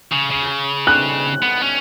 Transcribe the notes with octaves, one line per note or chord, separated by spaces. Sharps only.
C#3
C#3
F#6
B3
C#4